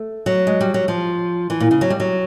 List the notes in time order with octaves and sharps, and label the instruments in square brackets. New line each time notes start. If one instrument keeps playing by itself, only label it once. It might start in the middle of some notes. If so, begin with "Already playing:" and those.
Already playing: [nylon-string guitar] A3
F#3
G#3
G3
F#3
F3
E3
A#2
C#3
F#3
G3
F#3